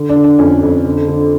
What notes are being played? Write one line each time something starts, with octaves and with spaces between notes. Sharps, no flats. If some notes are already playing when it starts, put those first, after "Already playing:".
Already playing: D3
D4
D3
D4
F2 C#4
F2
D3
D3